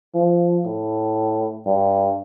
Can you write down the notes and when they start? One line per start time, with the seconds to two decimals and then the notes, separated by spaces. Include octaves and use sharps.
0.14 F3
0.65 A2
1.66 G2